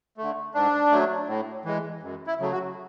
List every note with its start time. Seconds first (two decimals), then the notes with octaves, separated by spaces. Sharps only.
0.17 D3 A3
0.54 G#2 D4
0.92 F#3 A3
1.28 A2
1.65 E3 G#3
2.02 F#2
2.27 E4
2.39 C#3 F#3 A3
2.51 F#4